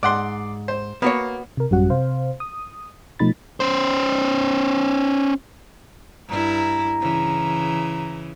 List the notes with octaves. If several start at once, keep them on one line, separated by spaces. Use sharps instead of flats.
G#2 D5 F#5 C6
C5
A#3 B3 F#4 C#5
C3 A#4
A1 F#2 G3 C#4 F#4 F#5
C3 C5 F5
D#6
B2 F3 A3 D#4 B5 A6
C#4 C5
G2 E4 A#5
C#3 E3